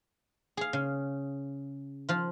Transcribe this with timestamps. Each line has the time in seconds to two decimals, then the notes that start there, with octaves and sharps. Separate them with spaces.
0.57 G#4 F5
0.73 C#3
2.09 F3 F4